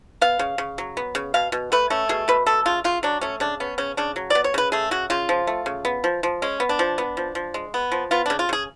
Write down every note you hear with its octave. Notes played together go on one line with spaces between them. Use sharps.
B3 F5
C#3
C#3
F#3
B3
C#3
B2 F5
B2
A3 B4
A3 C#4
B2 G#4
B2 B4
A3 A4
C#3 F4
C#3 F4
F#3 D4
A3 C#4
C#3 D4
B3 C#4
C#3 C#4
C#3 D4
F#3
B3 D5
C#5
C#3 B4
A3 G#4
C#3 F#4
C#3 F4
F3
A3
C#3
B3
F3
F3
G#3 C#4
B3
D4
F3
B3
F3
F3
G#3
B3
F3
B3 F4
C#3 D4
F4
C#3 G#4